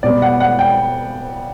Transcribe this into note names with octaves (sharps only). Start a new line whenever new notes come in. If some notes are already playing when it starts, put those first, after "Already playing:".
B2 G3 B3 D5
F#5
F#5
G5